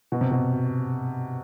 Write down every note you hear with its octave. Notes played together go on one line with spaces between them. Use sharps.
B2
C3
B2